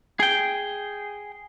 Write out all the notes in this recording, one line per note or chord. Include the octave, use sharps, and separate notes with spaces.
G#4 G5